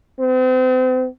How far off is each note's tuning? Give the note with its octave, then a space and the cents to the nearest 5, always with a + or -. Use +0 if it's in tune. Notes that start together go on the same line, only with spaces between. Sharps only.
C4 -35